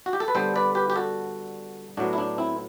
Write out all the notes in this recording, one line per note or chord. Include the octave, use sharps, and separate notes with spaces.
F#4
G4
A4
B4
D3 G3 B3 A4 C5
B4 D5
G4 B4
G4
F#4 A4
A2 F#3 B3 D4 F#4
E4
D4
C4 E4